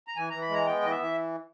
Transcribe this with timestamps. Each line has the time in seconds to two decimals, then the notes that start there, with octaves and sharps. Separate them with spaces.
0.08 A#5
0.16 E3 G#5
0.30 E3 A#5
0.42 B5
0.49 G#3 A#5
0.66 B3 G5
0.82 E3 D#5
0.91 E5
0.99 E3